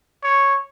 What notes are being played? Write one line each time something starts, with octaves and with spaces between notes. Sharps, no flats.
C#5